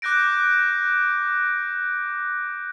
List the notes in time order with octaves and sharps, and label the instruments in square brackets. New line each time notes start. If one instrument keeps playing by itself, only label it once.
[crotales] D6 F#6 G6 A#6 D7